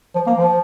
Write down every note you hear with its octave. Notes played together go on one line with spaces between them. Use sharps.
F3
A#3
F3